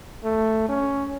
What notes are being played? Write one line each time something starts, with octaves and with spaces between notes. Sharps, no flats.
A3
C#4